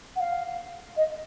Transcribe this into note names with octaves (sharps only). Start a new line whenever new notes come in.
F#5
F5
D#5